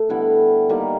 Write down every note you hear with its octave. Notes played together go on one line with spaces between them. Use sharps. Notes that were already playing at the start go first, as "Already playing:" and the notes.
Already playing: A3
D3 G3 B3 E4
D#3 G3 A#3